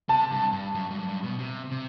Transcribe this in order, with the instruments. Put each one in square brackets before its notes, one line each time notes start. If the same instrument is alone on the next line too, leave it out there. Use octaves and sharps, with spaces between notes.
[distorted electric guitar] C3 [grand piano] A5
[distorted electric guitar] G2
G2
F#2
G2
F#2
G2
B2
C3
C3